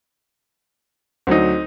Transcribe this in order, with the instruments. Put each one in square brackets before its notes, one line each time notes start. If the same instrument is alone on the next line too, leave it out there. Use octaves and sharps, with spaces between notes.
[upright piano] D2 F#3 [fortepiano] C4 D#4